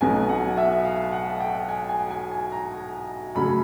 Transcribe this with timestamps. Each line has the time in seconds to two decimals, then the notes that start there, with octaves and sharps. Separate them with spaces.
0.01 B1 B2 F#3 B3 G#5
0.29 F#5
0.57 E5
0.85 F5
1.12 F#5
1.40 G5
1.68 G#5
1.89 G#5
2.11 G#5
2.31 G#5
2.52 A#5
3.35 F#2 C#3 F#3 A3 C#4 B5